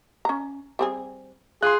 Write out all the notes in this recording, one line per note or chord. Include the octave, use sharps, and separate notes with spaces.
C#4 A#5
G3 C4 G#4
F4 G#4 C6 F#6